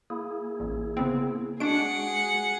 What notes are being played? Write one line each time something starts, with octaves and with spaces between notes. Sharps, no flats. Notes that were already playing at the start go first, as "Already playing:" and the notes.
A#3 E4 G#4
A1
C#3 B3 C4
G#3 D4 F#4 G#4 F#5 D7